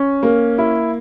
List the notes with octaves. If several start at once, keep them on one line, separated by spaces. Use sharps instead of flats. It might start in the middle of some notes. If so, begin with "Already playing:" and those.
Already playing: C#4
A#3
E4